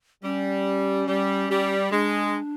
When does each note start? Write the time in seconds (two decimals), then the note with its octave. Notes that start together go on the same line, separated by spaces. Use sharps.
0.22 G3 C#4
1.07 G3
1.48 G3
1.91 G#3 D4